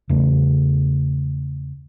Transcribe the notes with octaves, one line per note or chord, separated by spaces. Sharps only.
E2 C#3 A3